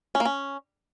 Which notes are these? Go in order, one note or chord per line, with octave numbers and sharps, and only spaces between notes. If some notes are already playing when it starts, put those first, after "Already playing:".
C#4
A#3
C#4